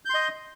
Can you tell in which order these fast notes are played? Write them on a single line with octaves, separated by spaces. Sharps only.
G6 C6 D#5